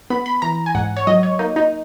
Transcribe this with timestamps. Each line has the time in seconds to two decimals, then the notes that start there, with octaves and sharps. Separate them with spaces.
0.10 B3 B5
0.26 B5
0.42 E3 A#5
0.66 G#5
0.75 G#2 F#5
0.97 C#5
1.07 F#3 D#5
1.23 C#5
1.39 A#3 D#4
1.56 D#4